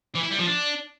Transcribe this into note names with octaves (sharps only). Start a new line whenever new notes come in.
E3
E4
G3
F3
D4